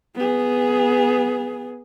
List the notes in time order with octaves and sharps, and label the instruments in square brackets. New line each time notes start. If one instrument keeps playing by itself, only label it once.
[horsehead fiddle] B3 G#4